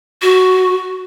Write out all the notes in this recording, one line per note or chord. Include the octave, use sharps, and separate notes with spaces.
F#4